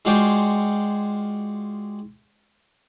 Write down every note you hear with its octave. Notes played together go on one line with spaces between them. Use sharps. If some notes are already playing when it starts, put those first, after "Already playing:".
G#3 F4 F#4 D5 G5 G#5